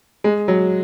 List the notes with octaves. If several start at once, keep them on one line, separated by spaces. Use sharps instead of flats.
G#3
F#3